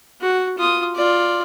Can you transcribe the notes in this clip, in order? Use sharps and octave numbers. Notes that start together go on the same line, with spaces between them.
F#4
F4 D#6
F4 D5